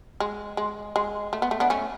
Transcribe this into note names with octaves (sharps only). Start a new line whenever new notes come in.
G#3
G#3
G#3
A3
B3
A3
B3 D4
A3 C#4